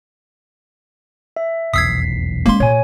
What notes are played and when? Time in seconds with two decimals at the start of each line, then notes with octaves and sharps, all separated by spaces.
1.37 E5
1.74 F1 B1 E2 D#6 E6 G#6 B6 C7
2.46 G#3 A#3 C#4 C6
2.60 A#2 C#5 G#5